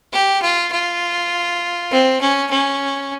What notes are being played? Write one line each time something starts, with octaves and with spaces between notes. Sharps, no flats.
G4
F4
F4
C4
C#4
C#4